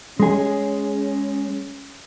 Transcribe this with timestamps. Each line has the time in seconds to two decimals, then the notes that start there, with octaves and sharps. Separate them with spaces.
0.20 G#3 C#4 G#4